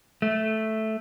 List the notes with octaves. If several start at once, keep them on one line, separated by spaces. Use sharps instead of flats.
A3